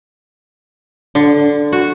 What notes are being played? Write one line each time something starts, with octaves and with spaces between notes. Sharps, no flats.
D3
F#4